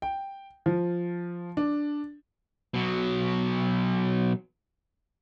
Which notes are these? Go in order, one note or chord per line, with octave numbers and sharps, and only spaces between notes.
G5
F3
D4
B2 F#3